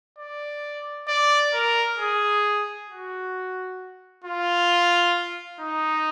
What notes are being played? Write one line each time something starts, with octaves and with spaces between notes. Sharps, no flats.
D5
D5
A#4
G#4
F#4
F4
D#4